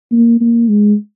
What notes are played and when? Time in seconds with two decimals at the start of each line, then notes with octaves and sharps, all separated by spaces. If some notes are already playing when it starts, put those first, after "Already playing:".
0.12 A#3
0.41 A#3
0.68 G#3